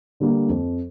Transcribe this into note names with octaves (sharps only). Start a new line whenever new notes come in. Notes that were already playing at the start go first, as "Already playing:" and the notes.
D3 G3 A#3
F2